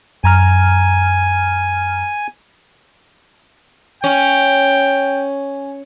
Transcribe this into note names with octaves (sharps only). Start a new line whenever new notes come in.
F#2 G#5 A#5 F6
C#4 G5